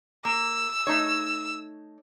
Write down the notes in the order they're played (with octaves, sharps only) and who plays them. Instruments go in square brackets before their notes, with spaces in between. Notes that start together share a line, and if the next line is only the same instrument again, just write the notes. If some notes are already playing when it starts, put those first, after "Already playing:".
[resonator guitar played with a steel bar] A#3 [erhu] E6
[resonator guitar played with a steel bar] A3 D#4 C#5